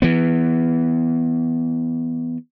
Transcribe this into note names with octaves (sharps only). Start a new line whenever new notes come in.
E3 B3